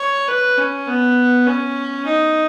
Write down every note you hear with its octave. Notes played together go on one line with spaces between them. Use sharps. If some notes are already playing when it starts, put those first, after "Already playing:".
Already playing: C#5
B4
C#4
B3
C#4
D#4